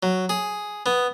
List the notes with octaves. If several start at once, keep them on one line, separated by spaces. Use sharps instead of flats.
F#3
G#4
B3